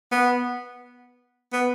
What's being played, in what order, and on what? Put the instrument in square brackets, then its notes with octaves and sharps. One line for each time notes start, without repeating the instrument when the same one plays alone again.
[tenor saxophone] B3
B3